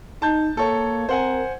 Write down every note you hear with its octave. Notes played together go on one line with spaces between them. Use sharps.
D#4 A5 G6
A#3 A4 C#5
C4 A#4 C5 F#5 G#5